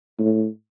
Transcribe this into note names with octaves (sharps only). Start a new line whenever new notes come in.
A2